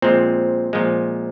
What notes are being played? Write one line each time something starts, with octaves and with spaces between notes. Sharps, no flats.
A#2 F3 G#3 C4
A#2 F3 G#3